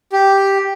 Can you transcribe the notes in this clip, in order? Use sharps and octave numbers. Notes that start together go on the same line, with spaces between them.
G4